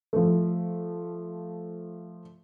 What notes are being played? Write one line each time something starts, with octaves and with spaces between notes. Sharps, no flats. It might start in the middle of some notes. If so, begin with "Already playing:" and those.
F3 A3